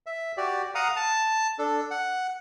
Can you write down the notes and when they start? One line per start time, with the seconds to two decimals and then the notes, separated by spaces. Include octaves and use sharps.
0.06 E5
0.37 F#4 G4 D5
0.75 F5 F#5 A#5 D#6
0.96 A5
1.59 D4 A4
1.91 F#5